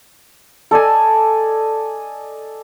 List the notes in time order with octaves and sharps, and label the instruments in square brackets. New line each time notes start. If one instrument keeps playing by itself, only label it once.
[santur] A4 D5 D#5 G#5